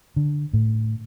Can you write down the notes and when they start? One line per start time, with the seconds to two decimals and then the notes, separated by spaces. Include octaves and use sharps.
0.16 D3
0.53 A2